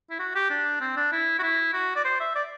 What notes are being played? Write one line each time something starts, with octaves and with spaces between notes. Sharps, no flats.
E4
F#4
G4
D4
C4
D4
E4
F#4
E4
F#4
D5
C5
E5
D5